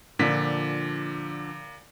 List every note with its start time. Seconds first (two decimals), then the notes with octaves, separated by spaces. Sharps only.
0.19 A#2 D3 F3 D4 B6